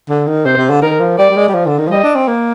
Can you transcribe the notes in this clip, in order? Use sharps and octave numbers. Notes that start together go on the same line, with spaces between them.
D3
D#3
C3 C5
C3
D3
D#3 A#4
F3
G3 D5
G3
G#3
G3
F3
D3
D#3
F3
G3 D#5
D4
C4
A#3